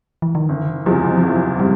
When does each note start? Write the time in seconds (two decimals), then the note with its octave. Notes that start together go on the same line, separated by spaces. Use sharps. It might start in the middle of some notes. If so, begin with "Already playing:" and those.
0.22 E3
0.35 D#3
0.48 F#1 D3
0.86 E2 C3 F3 F#3 G#3
1.18 F3
1.23 F#1 F#3
1.60 C3 G3